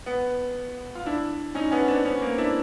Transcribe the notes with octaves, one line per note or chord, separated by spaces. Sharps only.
B3
F4
D4 E4
C#4 D#4
B3 C#4
C4 D4
B3 C#4
A#3 C4
D4 E4